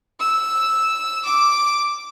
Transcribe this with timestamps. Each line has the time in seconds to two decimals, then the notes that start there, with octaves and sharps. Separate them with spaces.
0.20 E6
1.25 D6